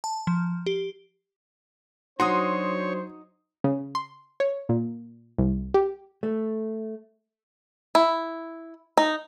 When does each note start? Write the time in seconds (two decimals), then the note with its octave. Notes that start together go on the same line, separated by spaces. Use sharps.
0.04 A5
0.27 F3
0.66 G4
2.20 F#3 D4 D#4 F#4 C5 C#5 C6 D#6
3.64 C#3
3.95 C6
4.40 C#5
4.69 A#2
5.38 C2
5.74 G4
6.23 A3
7.95 E4
8.97 D#4